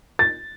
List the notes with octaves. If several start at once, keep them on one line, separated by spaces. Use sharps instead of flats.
A6